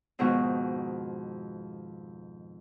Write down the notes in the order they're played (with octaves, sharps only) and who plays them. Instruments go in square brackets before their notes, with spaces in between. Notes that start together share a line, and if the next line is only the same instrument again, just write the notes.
[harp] F2 G#2 B2 D#3 F#4 C#6